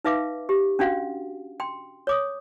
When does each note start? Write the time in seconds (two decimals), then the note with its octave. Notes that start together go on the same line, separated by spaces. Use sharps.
0.04 D#4 B4 E5 F5 D6
0.49 G4
0.79 C#4 D4 F#4 F5 F#5
1.60 G5 C6
2.07 C#5 D6 D#6